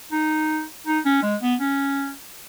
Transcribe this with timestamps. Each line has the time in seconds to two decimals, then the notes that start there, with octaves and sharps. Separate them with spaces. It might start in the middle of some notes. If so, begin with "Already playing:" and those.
0.12 D#4
0.87 D#4
1.05 C#4
1.23 G#3
1.42 B3
1.60 C#4